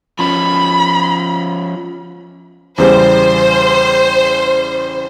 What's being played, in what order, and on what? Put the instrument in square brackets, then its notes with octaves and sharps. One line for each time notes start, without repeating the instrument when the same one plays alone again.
[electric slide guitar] F3 C#4 [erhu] B5
[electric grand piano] E2 C#3 G3 [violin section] C5